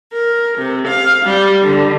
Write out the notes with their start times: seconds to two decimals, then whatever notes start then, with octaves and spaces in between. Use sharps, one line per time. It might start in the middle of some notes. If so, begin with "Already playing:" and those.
0.13 A#4
0.57 C3
0.87 F5
1.25 G3
1.62 D3